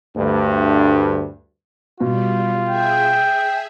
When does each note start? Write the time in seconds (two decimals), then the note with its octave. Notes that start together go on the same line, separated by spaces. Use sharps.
0.16 D2 G2
2.00 B2 G3 F4
2.69 G#4 E5 G5